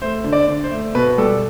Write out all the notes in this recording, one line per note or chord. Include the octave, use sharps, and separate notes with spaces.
A3 C5
D3
D5
D3
C5
A3
B2 B4
G3 A4